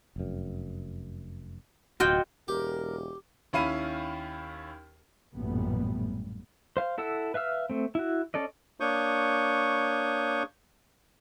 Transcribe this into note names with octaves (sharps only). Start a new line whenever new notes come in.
F1 F#2
D1 B2 F4 F#4 D#5 G5
E1 G4 A#4
D#2 C#4 E4 F5 B5 D#7
A1 F#2 A#2 G3 A3 B3
C5 F5
E4 A4 F#5 E6
B4 E5 F5 E6 F6
A3 C4
E4 F#4
C#4 A4 D5 D#5
A#3 D4 C#5 C#6 D#6 G6